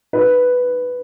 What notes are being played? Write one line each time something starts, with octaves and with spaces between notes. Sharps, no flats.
B4